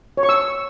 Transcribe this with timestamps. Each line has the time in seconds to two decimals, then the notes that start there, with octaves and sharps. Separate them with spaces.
0.17 C#5
0.23 C#6
0.29 E6